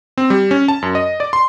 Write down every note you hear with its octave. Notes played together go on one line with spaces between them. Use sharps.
C4
G3
C#4
A5
F#2
D#5
D5
C6